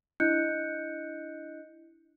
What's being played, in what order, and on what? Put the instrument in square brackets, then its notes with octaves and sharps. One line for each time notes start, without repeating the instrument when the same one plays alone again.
[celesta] D4 E4 D#5 F#6 G6 C#7